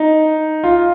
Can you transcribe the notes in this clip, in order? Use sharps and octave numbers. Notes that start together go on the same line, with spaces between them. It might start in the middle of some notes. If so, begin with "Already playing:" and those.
Already playing: D#4
F4